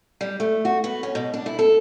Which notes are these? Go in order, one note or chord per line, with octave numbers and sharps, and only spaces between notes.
G3
A3
F#4
B3
C#4
B2
D4
E4
A4